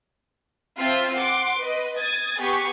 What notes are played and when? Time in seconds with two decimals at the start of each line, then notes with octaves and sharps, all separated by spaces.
0.79 C4 F4 E5 A5
1.15 F#5 C6 D6
1.58 B4 D#5
1.97 D#6 G#6 A6
2.39 B3 G4 G#4 C#6